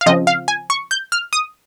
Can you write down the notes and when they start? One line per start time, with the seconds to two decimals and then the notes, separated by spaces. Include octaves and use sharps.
0.01 F5
0.06 C#3 F3 C4 D#5
0.27 F5
0.48 G#5
0.70 C#6
0.91 G6
1.12 F6
1.33 D#6